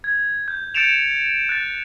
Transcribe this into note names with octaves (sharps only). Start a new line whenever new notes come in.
G#6
G6
G6 A6 C#7 D7 E7 F7
F#6 A6